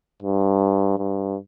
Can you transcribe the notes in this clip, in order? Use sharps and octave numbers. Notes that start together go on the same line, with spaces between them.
G2
G2